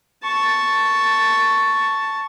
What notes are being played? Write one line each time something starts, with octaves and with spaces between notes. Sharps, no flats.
A5 C#6